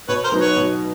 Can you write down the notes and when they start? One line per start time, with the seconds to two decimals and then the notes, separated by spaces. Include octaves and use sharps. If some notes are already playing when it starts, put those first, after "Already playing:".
0.08 B2 B4 C#5
0.24 A#4 C5
0.32 F#3 B3 D#4
0.40 B4 C#5
0.56 B2